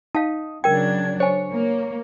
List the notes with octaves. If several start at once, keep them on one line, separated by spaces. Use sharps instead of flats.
D#4 F5 A5
C#3 F#3 D4 A#4 G5 G#6
C5 C#5 G#5
A#3